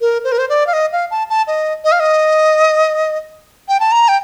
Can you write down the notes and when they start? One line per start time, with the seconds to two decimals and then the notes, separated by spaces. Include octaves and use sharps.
0.01 A#4
0.24 C5
0.32 A#4
0.38 C5
0.49 D5
0.67 F5
0.73 D#5
0.92 F5
1.11 A5
1.29 A5
1.47 D#5
1.84 D#5
1.92 F5
2.00 D#5
3.68 G5
3.80 A5
3.92 A#5
4.08 G5